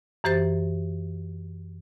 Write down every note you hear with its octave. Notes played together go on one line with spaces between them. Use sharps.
F#2 E3 G4 C5 A6